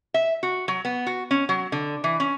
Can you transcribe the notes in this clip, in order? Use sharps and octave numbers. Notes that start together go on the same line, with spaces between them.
E5
F#4
F#3
B3
F#4
C#4
F#3
D3
E3
C#4